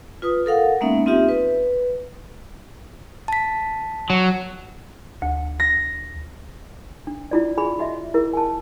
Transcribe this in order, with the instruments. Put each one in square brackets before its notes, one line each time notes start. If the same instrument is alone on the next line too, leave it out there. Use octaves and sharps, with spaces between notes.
[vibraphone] F4 B4 D#6
A4 A#4 F5 F#5
G#3 A#3 B3 C#4 D#4 E5
C4 D#4 F4 G4 E5
B4
[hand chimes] A5 B6
[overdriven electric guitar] F#3
[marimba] D2
[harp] A#6
[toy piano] D4
E4 F4 D5
G#4 G#5 B5
F#4 D#5 E5
E4 G#4 A#4
G#5 A5